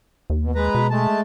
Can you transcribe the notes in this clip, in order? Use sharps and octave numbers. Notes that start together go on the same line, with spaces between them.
D#2
B2
G#3 B4 A#5
B2
G#3 A3 A5